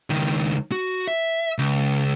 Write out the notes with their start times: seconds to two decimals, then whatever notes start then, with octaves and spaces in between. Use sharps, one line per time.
0.10 C#2 D#3
0.72 F#4
1.08 E5
1.58 C#2